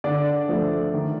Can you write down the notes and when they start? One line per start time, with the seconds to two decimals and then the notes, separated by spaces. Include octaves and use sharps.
0.04 D3 D4 D5
0.49 F3 A3
0.94 D#3